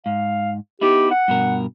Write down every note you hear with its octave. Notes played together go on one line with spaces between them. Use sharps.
G#2 F5
B3 D#4 E4 G4
F#5
G2 B2 A#4